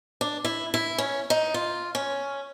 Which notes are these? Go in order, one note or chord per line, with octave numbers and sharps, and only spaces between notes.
D4
E4
E4
C#4
D#4
F4
C#4